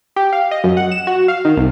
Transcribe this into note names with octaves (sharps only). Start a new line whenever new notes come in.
G4
F5
D#5
F#2
F#5
E7
F#4
F5
D#3
C2